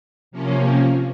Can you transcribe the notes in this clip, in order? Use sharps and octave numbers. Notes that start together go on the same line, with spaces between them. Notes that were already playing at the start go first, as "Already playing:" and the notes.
C3 F3 A#3 C#4